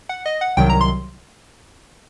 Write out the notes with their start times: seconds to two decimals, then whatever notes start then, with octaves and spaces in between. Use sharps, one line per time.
0.09 F#5
0.26 D#5
0.41 F#5
0.57 C2 C3 D#3 F#3 G5
0.70 A#5
0.81 C6